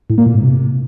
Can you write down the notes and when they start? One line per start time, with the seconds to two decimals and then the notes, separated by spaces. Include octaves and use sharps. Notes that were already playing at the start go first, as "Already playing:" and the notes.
0.10 A2
0.18 A#3
0.26 A#2
0.35 G#2
0.43 C3